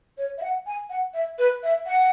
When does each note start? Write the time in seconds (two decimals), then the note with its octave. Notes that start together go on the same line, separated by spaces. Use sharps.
0.18 C#5
0.38 E5
0.42 F#5
0.67 G#5
0.90 F#5
1.14 E5
1.38 B4
1.63 E5
1.87 F#5